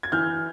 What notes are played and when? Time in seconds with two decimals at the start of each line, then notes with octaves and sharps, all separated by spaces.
0.03 G#6
0.12 E3 F6 G6